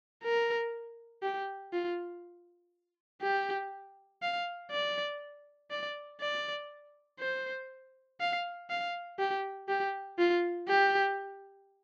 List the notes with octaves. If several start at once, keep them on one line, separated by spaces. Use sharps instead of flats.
A#4
G4
F4
G4
F5
D5
D5
D5
C5
F5
F5
G4
G4
F4
G4